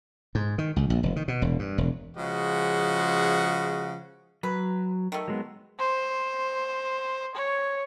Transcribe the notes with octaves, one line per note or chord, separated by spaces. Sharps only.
G#2
D#3
C#2
A#1
F1
D#3
B2
E1
G2
E1
C#3 F3 G#3 F#4
F#3 B4
D#3 A3
F#3 G#3 B3
C5
C#5